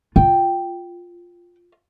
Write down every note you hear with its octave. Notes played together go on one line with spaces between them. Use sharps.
F4 G5